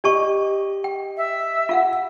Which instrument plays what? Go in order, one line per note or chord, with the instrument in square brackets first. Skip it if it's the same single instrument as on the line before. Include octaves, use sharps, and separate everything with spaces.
[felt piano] G4 D#5 [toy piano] D5 A5 C#6
[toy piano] G5
[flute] E5
[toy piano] F4 F5 F#5